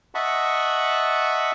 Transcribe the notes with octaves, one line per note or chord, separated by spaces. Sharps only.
D#5 E5 F#5 A5 B5 C#6